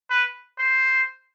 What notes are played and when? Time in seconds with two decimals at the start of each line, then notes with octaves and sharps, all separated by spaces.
0.10 B4
0.59 C5